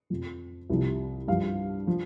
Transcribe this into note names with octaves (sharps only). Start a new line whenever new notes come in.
F2 F3
C2 C3 F3
G2 F3 F5
F3